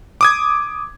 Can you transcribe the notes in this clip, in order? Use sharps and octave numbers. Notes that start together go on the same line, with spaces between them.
D6 D#6 G#6